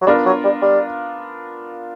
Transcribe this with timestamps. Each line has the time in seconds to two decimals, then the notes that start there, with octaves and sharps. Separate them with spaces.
0.01 F#3
0.07 G3 B3 D4 F4 A#4
0.26 F#3
0.44 G3
0.62 G3